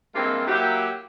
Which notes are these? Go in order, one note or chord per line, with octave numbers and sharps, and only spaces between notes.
G2 G#3 A#3 C4 E4 F4
F#3 A#3 E4 G4